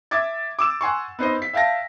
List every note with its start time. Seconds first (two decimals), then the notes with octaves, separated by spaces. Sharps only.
0.11 E5 D6 G#6 A6
0.59 D6 E6 E7
0.81 F#5 G#5 C6 C#6
1.19 B3 D#4 C5 D#5
1.42 B6
1.53 E5 F5 G5 A5 A#6